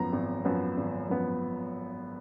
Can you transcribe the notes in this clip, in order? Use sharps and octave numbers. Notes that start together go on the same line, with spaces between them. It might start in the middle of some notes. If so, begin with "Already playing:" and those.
Already playing: G#1 F#2 F3 B3 A#5
G#1
F#2 F3 B3
G#1
F#2 F3 B3